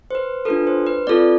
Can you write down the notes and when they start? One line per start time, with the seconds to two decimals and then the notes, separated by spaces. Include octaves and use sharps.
0.11 C5
0.15 B4
0.45 D4 F4 A4 B4
0.67 C5
0.87 B4
1.07 C4 F4 A4 D5